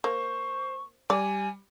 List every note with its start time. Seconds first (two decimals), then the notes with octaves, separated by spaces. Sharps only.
0.04 A#3 C5 C#6
1.10 G3 D5 G#5